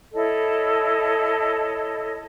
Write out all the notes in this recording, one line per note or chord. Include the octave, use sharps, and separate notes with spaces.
E4 A4 C#5 D#5